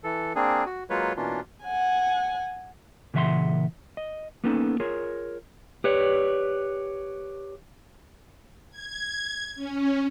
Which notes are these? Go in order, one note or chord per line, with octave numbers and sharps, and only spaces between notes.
E3 A4
A#3 C4 D4 G#4
F#4
F#3 G#3 A#3 F4 B4 C#5
B2 E3 A#3 C#4 D4 F4
F#5 G#5
A#2 C#3 E3 E5 F#5 C6
D#5
A#3 B3 C#4 D#4 A4
F4 G#4 A#4 C#5
G4 B4 C#5 D5
G#6
C#4